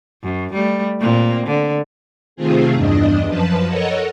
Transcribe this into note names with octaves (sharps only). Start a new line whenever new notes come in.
F#2
G3 A3
A#2 A#3 C4
D3
C3 D#3 A3 C4 F4 G#4
E2 G2 D4 D#5
F#2 F3 B4 A5
A4 A#4 C#5 D#5 F#5